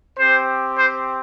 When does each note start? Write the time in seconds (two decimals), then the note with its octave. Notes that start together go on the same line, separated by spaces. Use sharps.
0.17 C4 G4 C5
0.77 C5